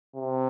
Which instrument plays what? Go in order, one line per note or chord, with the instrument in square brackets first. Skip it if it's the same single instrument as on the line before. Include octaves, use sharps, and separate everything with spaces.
[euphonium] C3